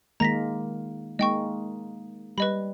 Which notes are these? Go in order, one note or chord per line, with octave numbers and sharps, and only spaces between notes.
D#3 G#3 A#3 A#5 A#6 B6
G#3 A#3 D#4 D#5 G5 C#6
G3 B4 D#5 B5